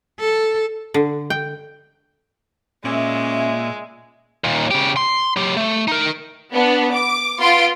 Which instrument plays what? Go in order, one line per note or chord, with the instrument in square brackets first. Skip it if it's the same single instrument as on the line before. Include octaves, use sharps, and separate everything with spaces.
[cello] A4
[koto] D3
G5
[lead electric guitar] A#2 [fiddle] G#3 [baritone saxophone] C#4 [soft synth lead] E5
[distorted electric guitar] D#2 A#2
C#3 G4
C6
F#3 G4
A3
D#4 A#4
[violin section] B3 D4
D6
B3 F4 C6 D7